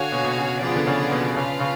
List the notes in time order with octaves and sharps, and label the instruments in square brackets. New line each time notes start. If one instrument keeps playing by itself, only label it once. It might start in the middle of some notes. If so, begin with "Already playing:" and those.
Already playing: [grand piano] D3 [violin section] F#4 C#5 F5 G#5
[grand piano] B2
B2
C#3
[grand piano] F3 [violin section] B3 F4 G#4 D5
[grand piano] D3
C#3
B2
[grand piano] C#3 [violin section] D4 F4 B4 F5
[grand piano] C#3